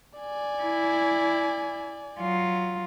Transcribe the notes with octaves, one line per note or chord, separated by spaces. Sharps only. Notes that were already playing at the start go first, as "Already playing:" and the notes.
D5 G#5
E4
F#3 F4